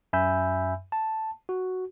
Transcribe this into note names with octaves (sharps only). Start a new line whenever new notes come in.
F#2 E5 G#5 B5 E6 G6
A5
F#4